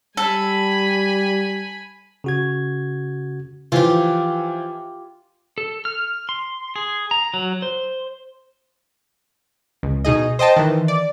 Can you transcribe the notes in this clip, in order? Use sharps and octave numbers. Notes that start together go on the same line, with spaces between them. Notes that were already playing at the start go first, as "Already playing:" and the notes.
G3 A4 G#5 B5
C#3 F#4 G#6
E3 F3 F4 G4
A4
F6
C6
G#4
A#5
F#3
C5
C#2
B2 D#4 G#4 D#5
C5 D#5 G5 A5
D#3 E3
D5